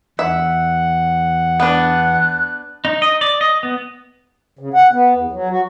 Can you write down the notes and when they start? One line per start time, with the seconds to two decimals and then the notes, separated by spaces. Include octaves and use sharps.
0.19 E2 E5 F#5
1.60 B3 D4 F#6
2.85 D#4
3.02 D#5
3.21 D5
3.41 D#5
3.63 B3
4.59 C#3
4.74 F#5
4.92 B3
5.14 E2
5.32 F#3
5.50 F#4